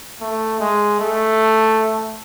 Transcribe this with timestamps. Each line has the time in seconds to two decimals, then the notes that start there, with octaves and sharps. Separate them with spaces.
0.21 A3
0.60 G#3
1.00 A3